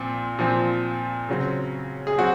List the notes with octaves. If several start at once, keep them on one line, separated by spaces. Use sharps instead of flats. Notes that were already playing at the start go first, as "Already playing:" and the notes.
Already playing: A#2 F3 C4
A#2 F3 C4
C#3 F#3 C4
G#4
F#3 C4 F#4